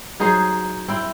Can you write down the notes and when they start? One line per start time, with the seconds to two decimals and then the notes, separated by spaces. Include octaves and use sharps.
0.20 F#3 D#4 G#4 C5
0.88 C4 E4 G5